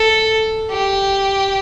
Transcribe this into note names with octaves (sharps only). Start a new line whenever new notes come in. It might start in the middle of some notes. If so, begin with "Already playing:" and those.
Already playing: A4
G4